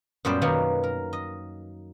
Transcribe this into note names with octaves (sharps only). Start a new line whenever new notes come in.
F#2 A#2 G3 B3 C5 D5
B2 D#3 F#3 A#3 B3
A#4
D#5